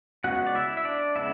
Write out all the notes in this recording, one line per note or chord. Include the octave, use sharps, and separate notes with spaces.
C#3 G#3 B3 F#4 F#5
D5
E4 E5
E5
D4 D5
C#3 G#3 B3 E4 E5